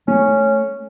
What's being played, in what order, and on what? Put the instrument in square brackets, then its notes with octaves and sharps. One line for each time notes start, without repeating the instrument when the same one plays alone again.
[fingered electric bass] A3 [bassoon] C#4